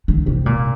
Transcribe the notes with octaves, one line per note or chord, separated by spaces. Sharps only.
D3
C3
A#2